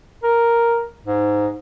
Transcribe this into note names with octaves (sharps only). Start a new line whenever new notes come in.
A#4
G#2